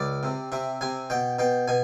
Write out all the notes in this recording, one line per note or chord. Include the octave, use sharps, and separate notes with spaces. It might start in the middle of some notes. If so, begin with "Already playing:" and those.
Already playing: C#2 D5
C3
C3 E5
C3 G#5
B2 G5
B2 G5
B2 G#5